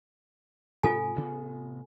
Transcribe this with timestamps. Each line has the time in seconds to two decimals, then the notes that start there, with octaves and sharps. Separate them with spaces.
0.83 G#2 C3 F4 A4 G#5
1.16 A1 C3 B3